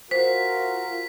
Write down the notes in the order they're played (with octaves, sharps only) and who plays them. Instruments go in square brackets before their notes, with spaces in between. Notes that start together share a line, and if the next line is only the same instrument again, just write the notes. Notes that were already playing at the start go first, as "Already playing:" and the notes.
[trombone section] F4 F#4 A#4 [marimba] C5 [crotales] B6